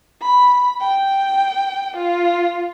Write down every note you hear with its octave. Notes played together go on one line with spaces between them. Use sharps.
B5
G5
F4